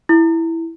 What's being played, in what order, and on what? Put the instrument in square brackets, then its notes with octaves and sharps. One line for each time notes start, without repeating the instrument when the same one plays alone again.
[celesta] E4